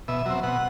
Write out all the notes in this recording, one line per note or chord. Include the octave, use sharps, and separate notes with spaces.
B2 E5
F#3 C4
B2 F#5